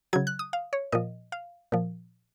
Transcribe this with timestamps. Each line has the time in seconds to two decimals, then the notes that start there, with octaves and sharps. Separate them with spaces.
0.13 C#3 F#3 G#6
0.27 F#6
0.39 D#6
0.53 F5
0.73 C#5
0.92 A#2 F3 D#5
1.32 F5
1.72 A#2 F3